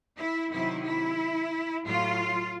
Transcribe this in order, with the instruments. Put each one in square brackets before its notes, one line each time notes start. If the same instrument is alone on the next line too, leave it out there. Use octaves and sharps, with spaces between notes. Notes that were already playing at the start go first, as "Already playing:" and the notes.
[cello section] E4
C3 D#3 F#3 E4
E4
A2 F#3 F4